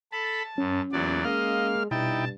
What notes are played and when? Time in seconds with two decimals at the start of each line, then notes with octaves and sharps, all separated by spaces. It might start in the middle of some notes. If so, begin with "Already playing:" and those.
0.12 A4 A5 B5
0.58 F#2 C#4
0.92 E2 A#2 F#3 D5
1.25 G#3 A#3 D#5 F5 F6
1.91 G2 B2 D#4 E4 G5 A5